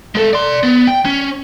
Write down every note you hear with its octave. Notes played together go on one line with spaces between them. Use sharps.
G#3 A4
D5 C6
B3
G5
C#4